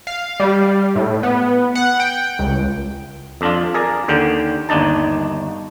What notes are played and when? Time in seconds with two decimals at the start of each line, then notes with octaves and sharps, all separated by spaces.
0.07 F5
0.40 G3
0.96 A2
1.23 B3
1.75 F#5
2.00 G5
2.39 C#2
3.41 F2 D4 F4
3.74 G#4 A#4 D5
4.08 D#2 D3 G5
4.69 G1 D#2 D4 D#4 A5